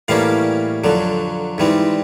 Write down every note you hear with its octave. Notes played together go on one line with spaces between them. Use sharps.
A2 E3 G3 A#3 C#4 F5
F2 D3 F#3
G#2 E3 G3 C4